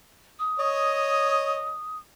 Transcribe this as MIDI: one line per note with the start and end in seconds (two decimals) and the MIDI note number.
0.39 1.98 87
0.60 1.74 73
0.60 1.74 75